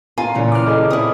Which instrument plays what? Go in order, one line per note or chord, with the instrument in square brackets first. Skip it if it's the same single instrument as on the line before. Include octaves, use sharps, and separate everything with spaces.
[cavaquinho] F4 [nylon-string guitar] G#5 [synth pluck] A#5
[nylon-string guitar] A#2 C#3 E3
[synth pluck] D6 F6
G#4 A4 D#5
[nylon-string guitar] C4 [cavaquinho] E4 D#6